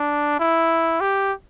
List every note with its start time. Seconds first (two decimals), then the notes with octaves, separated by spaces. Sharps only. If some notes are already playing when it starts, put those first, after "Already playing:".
Already playing: D4
0.40 E4
1.01 G4